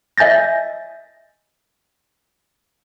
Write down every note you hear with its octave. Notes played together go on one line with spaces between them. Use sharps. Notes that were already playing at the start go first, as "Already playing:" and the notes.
D#5 E5 G#5 G6 A6 A#6